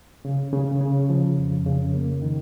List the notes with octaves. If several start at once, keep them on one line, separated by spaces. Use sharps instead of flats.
C#3
C#3
C#3
F3
F2
C#3
A#3
D#3